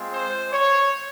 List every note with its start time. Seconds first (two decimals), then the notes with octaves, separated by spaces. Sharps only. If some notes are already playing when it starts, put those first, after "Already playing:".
Already playing: G#3 C4 F4
0.13 C5
0.52 C#5